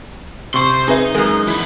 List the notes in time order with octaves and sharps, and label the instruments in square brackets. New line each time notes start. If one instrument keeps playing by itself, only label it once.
[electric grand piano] C3 C#6 [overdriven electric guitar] C5 C6
[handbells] C4 B4 E5 [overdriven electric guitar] D#4 [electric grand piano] G#4
[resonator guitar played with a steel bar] F#2 G#3 [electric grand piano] G#4 [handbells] A#4
[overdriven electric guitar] E3 B3 [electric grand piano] E4